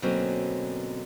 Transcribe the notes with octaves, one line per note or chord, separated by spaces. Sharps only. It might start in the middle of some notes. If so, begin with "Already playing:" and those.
B2 D3 F#3 A#3 C4 C#4